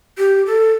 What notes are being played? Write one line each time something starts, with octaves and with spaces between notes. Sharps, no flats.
G4
A4